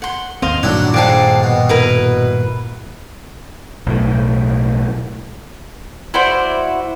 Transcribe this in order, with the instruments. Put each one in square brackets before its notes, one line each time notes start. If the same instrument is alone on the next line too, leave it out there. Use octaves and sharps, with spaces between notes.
[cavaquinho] F#5 C6
[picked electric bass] G#1 D#2 C4 [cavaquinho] D#5 F5 C6
[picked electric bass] G2 A#2 D#3 [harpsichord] F#3 D4 [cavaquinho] E4
[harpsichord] F2 G#2 C4 [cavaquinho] D5 G#5 A5
[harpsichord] B2
[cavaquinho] E4 A#4 B4
[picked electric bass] B1 A2
[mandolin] E4 F#4 C5 D5